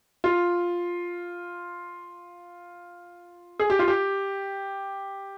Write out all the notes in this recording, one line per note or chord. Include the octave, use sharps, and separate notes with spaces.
F4
G#4
G4
F4
G4